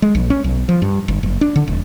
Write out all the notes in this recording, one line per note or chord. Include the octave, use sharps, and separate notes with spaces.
G#3
A#1
C#4
B1
F3
G2
G1
F#1
D4
D3
E1